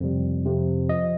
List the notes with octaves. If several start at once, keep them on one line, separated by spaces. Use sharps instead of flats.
F2 C3 G3
F2 C3 F3
F3 D#5